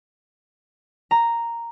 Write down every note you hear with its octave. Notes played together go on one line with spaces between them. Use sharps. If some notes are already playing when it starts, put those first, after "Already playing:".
A#5